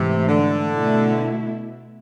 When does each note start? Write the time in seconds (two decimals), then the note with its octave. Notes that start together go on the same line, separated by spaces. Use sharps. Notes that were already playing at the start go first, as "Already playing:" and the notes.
Already playing: G#2 C3 E3 A3
0.28 D3
0.74 B2 A3 E4